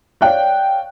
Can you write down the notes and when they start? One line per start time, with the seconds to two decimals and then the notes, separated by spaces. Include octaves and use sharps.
0.21 C#5 D5 F5 G5 F#6